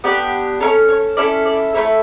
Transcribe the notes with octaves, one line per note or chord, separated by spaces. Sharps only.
B3 D4 G4
C#4 E4 A4 C#5
C#5
C#4 E4 A4 D5
D5
A3 C#4 E4 A4 C#5